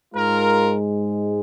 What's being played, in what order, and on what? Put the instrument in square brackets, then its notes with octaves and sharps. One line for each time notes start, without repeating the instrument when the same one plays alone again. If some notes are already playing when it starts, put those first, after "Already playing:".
[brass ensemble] G#2 G#3 F4 A#4